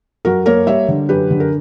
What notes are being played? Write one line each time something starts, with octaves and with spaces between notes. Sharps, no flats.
F#2 F#4 A#4
A#3 A#4 C#5
G3 C#5 E5
D3
F#2 G4 B4
D3
A#4